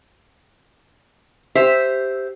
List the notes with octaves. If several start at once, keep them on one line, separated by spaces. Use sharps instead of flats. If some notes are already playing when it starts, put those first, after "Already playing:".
G4 C5 E5